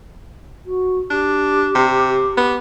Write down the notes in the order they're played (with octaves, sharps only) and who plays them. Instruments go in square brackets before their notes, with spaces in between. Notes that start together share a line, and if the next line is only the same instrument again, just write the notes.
[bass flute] F#4
[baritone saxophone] D4 [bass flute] G4
[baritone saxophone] C3
B3